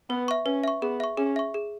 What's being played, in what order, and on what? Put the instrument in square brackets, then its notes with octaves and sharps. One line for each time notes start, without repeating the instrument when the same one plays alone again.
[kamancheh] B3 [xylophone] B4
[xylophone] E5 C#6
[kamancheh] C#4 [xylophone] B4
[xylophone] E5 C#6
[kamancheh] B3 [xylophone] G#4
[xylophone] E5 C#6
[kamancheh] C#4 [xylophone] G#4
[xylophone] E5 C#6
G#4